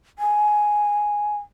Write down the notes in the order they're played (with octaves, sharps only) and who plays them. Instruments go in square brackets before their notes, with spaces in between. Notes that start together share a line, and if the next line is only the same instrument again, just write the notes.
[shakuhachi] G#5